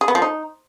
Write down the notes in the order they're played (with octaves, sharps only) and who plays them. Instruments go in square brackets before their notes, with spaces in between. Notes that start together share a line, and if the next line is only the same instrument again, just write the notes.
[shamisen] G#4
B3
F3
D#4